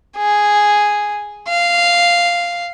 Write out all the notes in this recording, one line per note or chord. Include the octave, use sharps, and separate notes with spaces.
G#4
F5